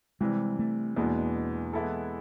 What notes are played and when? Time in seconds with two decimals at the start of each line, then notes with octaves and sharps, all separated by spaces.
0.21 C3 E3 G3 G#3
0.59 A3
0.96 E2 B2 G#3 A#3 B3 D4
1.73 E3 G#3 B3 E4 A4